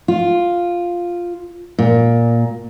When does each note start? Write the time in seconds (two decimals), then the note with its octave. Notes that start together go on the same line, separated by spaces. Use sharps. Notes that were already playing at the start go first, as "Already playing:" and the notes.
0.08 F4
1.78 A#2